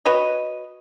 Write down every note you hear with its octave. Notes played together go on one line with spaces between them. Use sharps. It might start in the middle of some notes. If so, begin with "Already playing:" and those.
F#4 B4 C#5 D#5